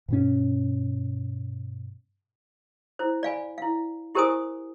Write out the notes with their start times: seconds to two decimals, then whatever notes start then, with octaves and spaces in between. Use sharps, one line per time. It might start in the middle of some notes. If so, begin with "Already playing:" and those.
0.08 G2 B2 C#4
2.99 E4 C5
3.23 D5 F5 G#5 B5
3.58 E4 F5
4.15 E4 G4 A#4 C5 G#5 D#6